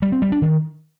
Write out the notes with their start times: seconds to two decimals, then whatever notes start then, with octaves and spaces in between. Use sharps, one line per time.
0.02 G3
0.12 C4
0.22 G3
0.32 D4
0.42 D#3